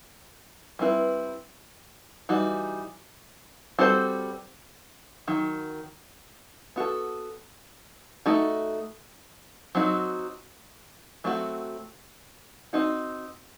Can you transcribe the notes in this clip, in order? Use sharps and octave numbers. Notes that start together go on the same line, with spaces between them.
G3 C4 E4 B4
E3 G3 D#4 F#4
G3 C4 F#4 A4 C5
D#3 F#3
B3 F#4 A4
A3 D#4 F#4 A4
F#3 C4 D#4 F#4
F#3 A3 C4 D#4 F#4
C4 D#4 F#4